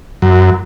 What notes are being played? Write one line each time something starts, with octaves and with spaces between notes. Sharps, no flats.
F#2